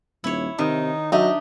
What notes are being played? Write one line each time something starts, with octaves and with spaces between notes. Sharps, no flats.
D#1 E4 C#5
C3 D#3 D#4
F#3 D4 D#4 G4 D#5 E5